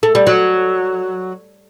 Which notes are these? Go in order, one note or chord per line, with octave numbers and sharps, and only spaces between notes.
A3
G3
F#3